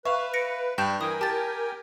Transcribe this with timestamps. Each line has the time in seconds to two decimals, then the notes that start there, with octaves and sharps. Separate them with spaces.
0.05 B4 E5 F5 C#6
0.34 A#6 C#7 D7
0.78 G2 G5 G6 E7
1.01 E3 A#4 G5 G#5 D#6
1.21 G4 A5 A6